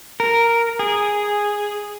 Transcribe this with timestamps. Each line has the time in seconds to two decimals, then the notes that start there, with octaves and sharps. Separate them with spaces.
0.20 A#4
0.79 G#4